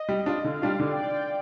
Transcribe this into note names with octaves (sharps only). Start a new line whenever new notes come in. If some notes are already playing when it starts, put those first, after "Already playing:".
Already playing: D#5
G3
D4 F4
D3 F5
G3 D4 F4
D3 D5
G5